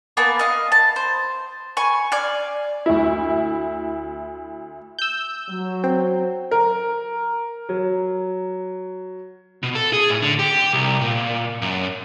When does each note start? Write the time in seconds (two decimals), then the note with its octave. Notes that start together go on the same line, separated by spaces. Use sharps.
0.17 A#3 B3 G#5 A5
0.39 D#5 F5
0.72 A5
0.96 C5
1.77 G#5 C#6
2.12 D5 F5 G#5
2.86 D2 E4
4.99 E6 G6
5.49 F#3
5.84 C4
6.51 A#4
7.69 F#3
9.63 B2
9.75 A4
9.93 G#4
10.10 A2
10.22 D3
10.39 G4
10.73 C2
11.01 A#2
11.62 F#2